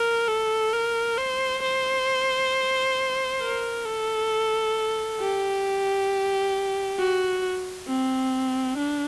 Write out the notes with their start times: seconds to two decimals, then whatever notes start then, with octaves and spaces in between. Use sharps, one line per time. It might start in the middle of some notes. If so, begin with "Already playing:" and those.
Already playing: A#4
0.28 A4
0.73 A#4
1.18 C5
1.62 C5
3.41 A#4
3.86 A4
5.20 G4
6.99 F#4
7.88 C4
8.78 D4